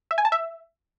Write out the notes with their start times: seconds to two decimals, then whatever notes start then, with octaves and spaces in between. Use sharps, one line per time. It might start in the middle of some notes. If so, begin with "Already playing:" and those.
0.11 E5
0.18 G#5
0.25 A5
0.32 E5